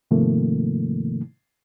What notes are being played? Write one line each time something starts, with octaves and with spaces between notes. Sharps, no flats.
G#2 C3 D#3 F3 A3 A#3